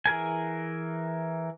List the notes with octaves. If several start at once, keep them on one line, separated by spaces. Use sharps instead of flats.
E3 G#4 A#4 G#5